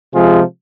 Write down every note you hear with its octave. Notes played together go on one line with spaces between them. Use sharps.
C3 F3 G#3 F4 G#4